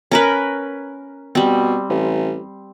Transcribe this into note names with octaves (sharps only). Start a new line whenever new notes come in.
C#4 A#4 B4
B2 G3 C4
A1